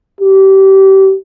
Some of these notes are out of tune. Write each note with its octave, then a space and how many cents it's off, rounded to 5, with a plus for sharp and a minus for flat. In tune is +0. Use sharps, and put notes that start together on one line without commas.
G4 -25